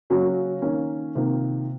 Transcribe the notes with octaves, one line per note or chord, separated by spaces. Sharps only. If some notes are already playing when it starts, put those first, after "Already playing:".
C#3 F#3 A#3 C#4 F#4
D#3 A#3 C#4
C3 D#3 A#3 F4